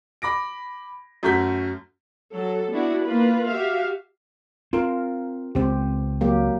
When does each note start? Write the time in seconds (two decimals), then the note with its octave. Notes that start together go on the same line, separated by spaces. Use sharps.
0.22 B5 D6 A#6 D7
1.23 F#2 A3 F#4 G6 B6
2.35 F#3 A4
2.72 B3 D4 E4 F#4
3.05 A#3 F4 B4
3.50 F#4 G4 E5 F5
4.73 C4 F4 A#4
5.55 C#2 C4 G4
6.21 F#3 A#3 G4